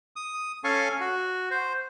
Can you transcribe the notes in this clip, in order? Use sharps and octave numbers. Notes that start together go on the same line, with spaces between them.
D#6
C#4 A4 F5 G#5 C#6
F#4
C5